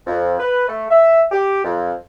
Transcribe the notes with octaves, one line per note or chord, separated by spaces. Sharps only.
F2
B4
A3
E5
G4
F2